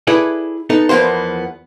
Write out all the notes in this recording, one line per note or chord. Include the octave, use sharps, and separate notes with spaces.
E4 G#4 A4 B4 D5
B3 D#4 A4
E2 F3 A#3 B3 C5